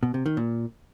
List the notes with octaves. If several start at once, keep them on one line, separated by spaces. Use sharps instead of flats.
B2
C3
D#3
A#2